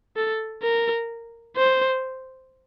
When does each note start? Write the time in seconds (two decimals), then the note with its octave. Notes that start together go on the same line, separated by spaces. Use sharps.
0.16 A4
0.62 A#4
1.56 C5